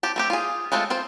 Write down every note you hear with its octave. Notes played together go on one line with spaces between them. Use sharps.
C4 G4 A5
A3 C4 G4
F4 G#4
G#3 A3 C4 F4 A4
C4 F4 C5